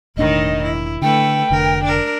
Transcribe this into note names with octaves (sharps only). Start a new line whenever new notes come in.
E1 A2 D#3 D4 D#4 D#5
E4
D3 A3 A4 B4 G5
F1 D3 A#4
D4 A#4